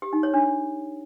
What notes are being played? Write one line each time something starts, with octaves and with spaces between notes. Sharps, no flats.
G4
D#4
C#5
D4